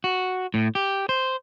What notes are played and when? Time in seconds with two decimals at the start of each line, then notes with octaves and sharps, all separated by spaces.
0.04 F#4
0.54 A2
0.75 G4
1.09 C5